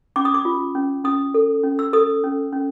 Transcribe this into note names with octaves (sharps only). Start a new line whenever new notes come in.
C#4 D6
D#6
D6
F4
C#4
C#4 D#6
A4
C#4
E6
A4 D#6
C#4
C#4